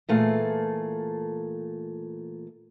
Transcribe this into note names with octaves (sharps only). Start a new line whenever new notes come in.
A#2 E3 A3 G#4 A4 F5